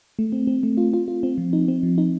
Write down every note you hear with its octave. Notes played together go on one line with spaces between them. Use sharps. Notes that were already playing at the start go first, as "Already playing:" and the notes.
A3
C4
C4
A3
F4
F4
F4
C4
F3
D#4
C4
F3
D#4